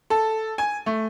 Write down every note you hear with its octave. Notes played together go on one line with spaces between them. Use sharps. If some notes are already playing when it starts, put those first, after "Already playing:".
A4
G#5
A3